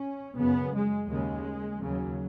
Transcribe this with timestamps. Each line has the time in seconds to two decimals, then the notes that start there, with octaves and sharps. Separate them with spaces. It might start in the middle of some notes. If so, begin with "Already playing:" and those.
Already playing: C#4
0.38 F#2 C#3 B3
0.74 G#3
1.10 D#2 C#3 G#3
1.82 D#2 C#3 F#3